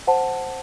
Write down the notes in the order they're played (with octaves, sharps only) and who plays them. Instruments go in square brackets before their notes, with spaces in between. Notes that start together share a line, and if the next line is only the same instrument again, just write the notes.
[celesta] C5 F#5 A5